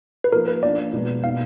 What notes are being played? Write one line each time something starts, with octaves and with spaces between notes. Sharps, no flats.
B4
F3 A#3 D#4 A#4
B4
F3 A#3 D4 D5
B2 G#3 B3 D#4
B2 A#3 D#4 F5